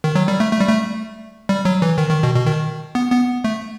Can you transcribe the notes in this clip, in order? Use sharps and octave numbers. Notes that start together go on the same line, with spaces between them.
D#3
F#3
G3
A3
A3
G3
A3
G3
F#3
E3
D#3
D#3
B2
B2
D#3
B3
B3
A3